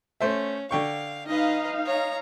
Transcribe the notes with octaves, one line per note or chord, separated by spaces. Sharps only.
A3 C#4 C5 E5
D3 F5 G5 C#6
D#4 B4 D#5 F5
C#5 A#5